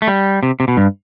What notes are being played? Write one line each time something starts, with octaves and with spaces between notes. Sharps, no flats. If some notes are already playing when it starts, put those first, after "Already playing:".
A3
G3
C3
C3
B2
G2